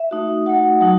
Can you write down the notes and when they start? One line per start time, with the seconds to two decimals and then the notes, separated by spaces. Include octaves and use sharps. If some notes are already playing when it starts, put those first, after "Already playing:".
Already playing: E5
0.11 A3 D#4 F#4
0.46 A3 D#4 F#4 F#5
0.81 F#3 A3 D#4 F#4